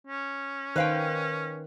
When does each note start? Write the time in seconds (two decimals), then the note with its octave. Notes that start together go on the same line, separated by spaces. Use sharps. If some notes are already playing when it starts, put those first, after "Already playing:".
0.07 C#4
0.76 D#3 B4 C5 F5 G5